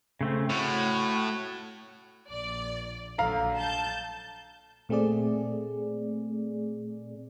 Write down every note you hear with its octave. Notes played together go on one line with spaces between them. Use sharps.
C#3 A3 C4
A2 F#4 C#5
A#1 D5
A#1 D3 F#3 F5 A#5
A5 G6
A#2 A3 C4 G#4 D5